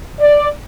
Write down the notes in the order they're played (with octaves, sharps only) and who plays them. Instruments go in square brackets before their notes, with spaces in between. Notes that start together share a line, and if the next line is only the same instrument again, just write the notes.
[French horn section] D5